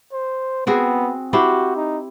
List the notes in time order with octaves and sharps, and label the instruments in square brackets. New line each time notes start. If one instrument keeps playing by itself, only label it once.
[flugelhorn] C5
[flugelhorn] B3 [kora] C4 F#4 G#4
[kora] E4 G4 C5 [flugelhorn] F#4
[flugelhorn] D#4